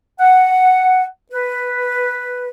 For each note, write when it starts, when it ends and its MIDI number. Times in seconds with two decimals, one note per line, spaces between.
0.20 1.04 78
1.32 2.49 71